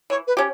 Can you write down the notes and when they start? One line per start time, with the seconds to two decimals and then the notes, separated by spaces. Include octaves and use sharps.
0.10 E3 C#5
0.27 B4
0.37 C#4 G4